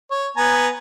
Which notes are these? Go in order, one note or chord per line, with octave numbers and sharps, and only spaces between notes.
C#5
B3 G#5 A#5